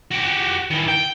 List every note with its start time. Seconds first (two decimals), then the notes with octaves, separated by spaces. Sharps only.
0.12 F#4 G4
0.71 D#3 E3
0.88 G5